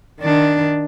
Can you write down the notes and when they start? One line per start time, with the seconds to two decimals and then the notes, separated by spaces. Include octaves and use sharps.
0.21 D#3 D4